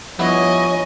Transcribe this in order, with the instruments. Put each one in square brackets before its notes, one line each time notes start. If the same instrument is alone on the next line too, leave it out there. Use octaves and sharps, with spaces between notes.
[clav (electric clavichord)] G2 B3 E4 [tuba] F3 [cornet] C#5 [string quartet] D#5 G#5